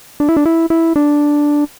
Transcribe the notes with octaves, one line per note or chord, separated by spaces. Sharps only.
D4
E4
D4
E4
E4
D4